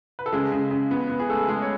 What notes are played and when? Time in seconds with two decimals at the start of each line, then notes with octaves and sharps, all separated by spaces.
0.19 B4
0.26 A4
0.32 C#3 G#3 G#4
0.52 C#3
0.71 C#3
0.91 B3
1.10 B3
1.20 G#4
1.29 G#3 A3 A4
1.48 G#3 G#4
1.62 C#5